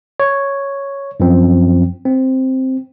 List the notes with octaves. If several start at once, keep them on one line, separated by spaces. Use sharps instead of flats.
C#5
F#2 F3 C4
C4